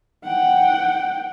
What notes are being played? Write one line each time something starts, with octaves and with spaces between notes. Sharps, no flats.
F#5 G5